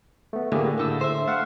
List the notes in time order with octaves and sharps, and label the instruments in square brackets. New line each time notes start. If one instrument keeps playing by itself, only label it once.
[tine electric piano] A3 B3
[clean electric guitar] D2 A2 D3 [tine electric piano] A#3 G4 G#4
[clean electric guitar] A2 A3 [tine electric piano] D3 E6
[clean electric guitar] C5 E5
[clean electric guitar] A3 [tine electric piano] F5 F#5